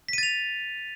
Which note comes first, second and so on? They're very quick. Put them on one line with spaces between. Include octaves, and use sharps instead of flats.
B6 D#7 A6 F7